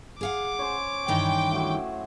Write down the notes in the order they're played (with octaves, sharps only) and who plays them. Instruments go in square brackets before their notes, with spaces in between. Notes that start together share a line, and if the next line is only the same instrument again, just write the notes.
[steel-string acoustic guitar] G#4 F5 F#5 [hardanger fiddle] D6
[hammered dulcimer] C#4 C5 C#5
[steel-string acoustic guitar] G2 D#3 E3 [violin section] G5
[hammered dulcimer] A2 F#3